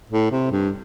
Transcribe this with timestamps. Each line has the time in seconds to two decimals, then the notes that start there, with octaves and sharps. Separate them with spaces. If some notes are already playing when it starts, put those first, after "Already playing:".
0.10 A2
0.31 C3
0.51 G2